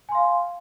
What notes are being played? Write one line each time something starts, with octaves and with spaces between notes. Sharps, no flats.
F5 G#5 C6